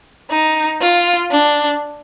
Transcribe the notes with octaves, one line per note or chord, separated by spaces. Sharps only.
D#4
F4
D4